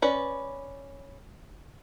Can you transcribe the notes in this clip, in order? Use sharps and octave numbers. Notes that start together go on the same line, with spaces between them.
C#4 B4 D5